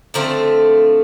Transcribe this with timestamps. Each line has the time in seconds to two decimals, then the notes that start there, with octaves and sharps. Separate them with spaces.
0.14 D3 F3 A3 C4